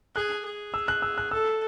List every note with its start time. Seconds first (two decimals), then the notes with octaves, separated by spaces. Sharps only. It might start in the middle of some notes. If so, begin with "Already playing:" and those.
0.15 G#4 F#6
0.45 G#4
0.74 E6
0.88 F#6
1.02 E6
1.18 F#6
1.31 A4 E6